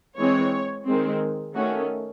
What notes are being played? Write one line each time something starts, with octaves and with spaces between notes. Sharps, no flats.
E3 G#3 C4 C#5
D#3 G#3 C4
D#3 A3 C#4 F#4